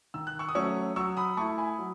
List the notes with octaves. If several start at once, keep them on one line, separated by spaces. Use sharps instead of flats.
D#3 E6
F#6
C#6 E6
D#6
F#3 A3 C#4 C#6 E6
F#3 C#6 E6
B5 D#6
A3 E4 A5 C#6
G#5 B5
F#3